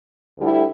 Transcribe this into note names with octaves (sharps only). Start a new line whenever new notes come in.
D2 D3 G3 E4